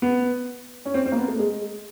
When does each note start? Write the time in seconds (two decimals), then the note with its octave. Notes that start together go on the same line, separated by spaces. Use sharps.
0.02 B3
0.85 C#4
0.94 C4
1.06 C4
1.12 A#3
1.17 B3
1.28 A3
1.39 G#3